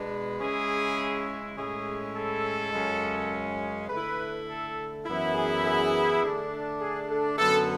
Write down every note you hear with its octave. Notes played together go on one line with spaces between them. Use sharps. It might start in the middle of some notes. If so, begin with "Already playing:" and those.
Already playing: B2 G#3 B3 D4
C#3 G#3 C#4 E4 G#4
A2 G#3 C#4 E4 G#4
A4
F#2 C#3 G#3 C#4
D3 A3 E4 B4
A4
F#2 E3 B3 E4
G#4
G#4
D3 A3 D4
G#4
A4
F#2 D3 F#3 B3 A4